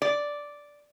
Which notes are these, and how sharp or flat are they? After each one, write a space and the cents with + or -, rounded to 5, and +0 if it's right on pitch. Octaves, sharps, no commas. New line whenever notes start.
D5 -5